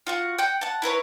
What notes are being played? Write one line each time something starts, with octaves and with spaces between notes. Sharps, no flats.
F4 F#4 F#5
F#5 G5
F#5 A5
E4 A#4 B4 C#5